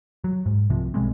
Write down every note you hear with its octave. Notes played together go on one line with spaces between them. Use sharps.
F#3
G#2
C2 C3 F3
B1 G3 G#3 C4